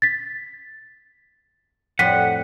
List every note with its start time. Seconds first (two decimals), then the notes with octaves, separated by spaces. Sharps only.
0.02 A6 B6
1.99 F2 A2 G3 F#5 B6 D#7